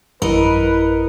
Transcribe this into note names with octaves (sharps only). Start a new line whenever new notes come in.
A1 F#2 E4 A#4 B4 D#5 C#7